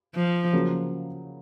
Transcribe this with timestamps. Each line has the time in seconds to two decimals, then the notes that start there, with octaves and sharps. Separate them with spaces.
0.15 F3
0.53 C#3 F#3 A#3